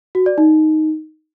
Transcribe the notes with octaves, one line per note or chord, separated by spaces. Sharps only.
F#4
D5
D#4